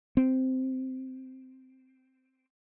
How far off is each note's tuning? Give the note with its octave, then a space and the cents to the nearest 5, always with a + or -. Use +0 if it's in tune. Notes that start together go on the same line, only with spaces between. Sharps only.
C4 -5